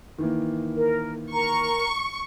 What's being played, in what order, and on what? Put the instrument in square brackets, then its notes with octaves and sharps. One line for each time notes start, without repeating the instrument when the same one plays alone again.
[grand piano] D#3 E3 A#3
[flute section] A#4
[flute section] A#4 A#5 [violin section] C#6